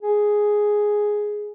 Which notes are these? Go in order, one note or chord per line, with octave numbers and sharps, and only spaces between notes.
G#4